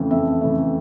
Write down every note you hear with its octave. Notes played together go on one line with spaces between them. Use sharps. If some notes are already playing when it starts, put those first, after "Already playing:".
Already playing: F2 C#3 E3 A3
F2 E5
C#3 E3 A3